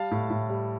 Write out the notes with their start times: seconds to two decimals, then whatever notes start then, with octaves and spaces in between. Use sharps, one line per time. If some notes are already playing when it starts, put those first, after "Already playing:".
Already playing: G3 F5 A5
0.11 A2
0.30 A2
0.49 G3